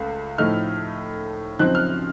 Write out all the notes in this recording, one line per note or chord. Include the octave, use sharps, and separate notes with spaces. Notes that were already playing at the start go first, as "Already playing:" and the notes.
Already playing: C#2 A3
A2 F3 A3 D#4 F6
F#2 C#3 F3 C4 D#4 F#6
F6